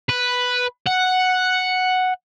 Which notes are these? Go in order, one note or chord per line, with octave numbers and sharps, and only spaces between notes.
B4
F#5